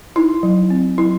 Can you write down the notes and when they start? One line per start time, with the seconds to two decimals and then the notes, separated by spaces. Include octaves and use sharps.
0.16 D#4 E4
0.43 F#3
0.70 C4
0.98 F#3 E4